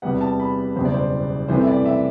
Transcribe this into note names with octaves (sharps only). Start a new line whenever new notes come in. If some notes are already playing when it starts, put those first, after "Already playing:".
E2 C3 G3 B3 F#5
A5
B5
F#1 E2 B2 G3 C5
D5
C5
C2 C3 E3 A3 C4 C5
E5
D5
E5